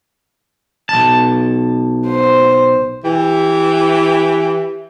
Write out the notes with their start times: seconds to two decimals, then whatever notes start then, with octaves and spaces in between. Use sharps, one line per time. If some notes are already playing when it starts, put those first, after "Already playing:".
0.89 B1 A5
2.07 C5
3.04 E3 G4